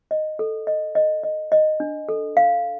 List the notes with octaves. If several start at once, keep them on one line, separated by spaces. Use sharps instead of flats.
D#5
A4
D#5
D#5
D#5
D#5
D4
A4
F5